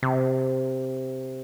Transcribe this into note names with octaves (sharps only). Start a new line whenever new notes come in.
C3